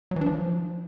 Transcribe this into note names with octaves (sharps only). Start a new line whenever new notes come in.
F#3
E3
D4
F3